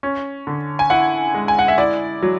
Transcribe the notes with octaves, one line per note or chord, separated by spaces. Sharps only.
C#4
D3
G#5
E4 F#5
G#3
G#5
F#5
E5
E4 D5
F#3